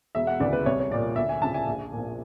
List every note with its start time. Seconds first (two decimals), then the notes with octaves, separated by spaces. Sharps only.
0.15 E1 E5
0.27 F#5
0.40 D2 C#3 E3 D5
0.53 B4
0.66 C2 C#5
0.80 C#5
0.91 A#2 F3 D5
1.16 D2 E5
1.29 G#5
1.42 C#3 F3 A5
1.54 G#5
1.67 A#1
1.93 A#2 F3